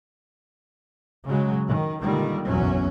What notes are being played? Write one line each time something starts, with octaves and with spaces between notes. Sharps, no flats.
C#3 F#3 G#3
D#3
A#2 D3 D#3 G3 G#3
F#1 B1 E2 F#3 C#4